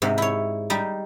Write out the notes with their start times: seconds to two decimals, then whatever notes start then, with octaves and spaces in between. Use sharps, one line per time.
0.02 G#2 C3
0.18 E4 C#5
0.70 G3 D#4